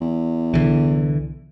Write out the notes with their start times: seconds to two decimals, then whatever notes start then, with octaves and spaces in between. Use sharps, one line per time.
0.01 E2
0.54 C2 D3 E3